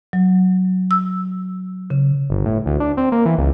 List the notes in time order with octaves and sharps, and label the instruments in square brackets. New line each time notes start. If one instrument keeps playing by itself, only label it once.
[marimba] F#3
E6
C#3
[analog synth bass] G1
A2
D2
D4
C4
A#3
E3
C#2